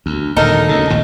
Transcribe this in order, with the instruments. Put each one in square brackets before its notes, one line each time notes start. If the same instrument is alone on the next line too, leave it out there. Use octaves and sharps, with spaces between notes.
[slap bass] D2
[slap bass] D#1 D3 [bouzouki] D#4 A4 A#4
[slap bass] D2 C#3
A1 D#2 A2